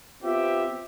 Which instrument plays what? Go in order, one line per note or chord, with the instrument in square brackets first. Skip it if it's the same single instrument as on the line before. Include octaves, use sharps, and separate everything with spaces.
[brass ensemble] B3 C4 F4 G4 E5